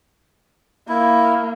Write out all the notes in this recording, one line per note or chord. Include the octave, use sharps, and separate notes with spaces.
A#3 E4